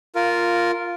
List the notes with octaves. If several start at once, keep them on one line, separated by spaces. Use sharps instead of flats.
F4 A#4